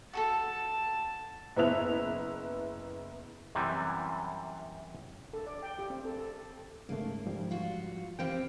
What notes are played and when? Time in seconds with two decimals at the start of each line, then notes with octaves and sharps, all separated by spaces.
0.13 F#4 G#4 A4 A5
1.57 F#1 B3 E4 E5 F#6 F7
3.55 F#2 C3 E3 G3
5.33 A4
5.47 D5
5.63 G5
5.79 G4
5.90 C4
6.05 A4
6.18 A4
6.89 G#2 C#3 A3 A#3
7.26 G#2 F3 G3
7.51 F4 F#4
8.19 C3 C4 G4 F5 G5